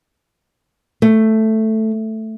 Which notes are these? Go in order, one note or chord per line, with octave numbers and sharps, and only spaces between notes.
A3